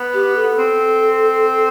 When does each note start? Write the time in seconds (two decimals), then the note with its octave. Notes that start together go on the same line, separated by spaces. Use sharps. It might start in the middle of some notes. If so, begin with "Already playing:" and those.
Already playing: B3
0.13 G4
0.36 A4
0.58 C4